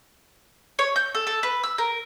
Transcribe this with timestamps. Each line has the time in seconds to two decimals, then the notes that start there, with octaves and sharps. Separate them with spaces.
0.79 C#5
0.96 G6
1.15 A4
1.27 A4
1.43 B4
1.64 E6
1.78 A#4